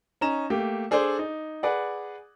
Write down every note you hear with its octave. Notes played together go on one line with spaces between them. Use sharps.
C#4 D#4 A#5 E7
A3 A#3 G4
D4 G#4 A4 C5 D5
D#4
G#4 B4 D5 F#5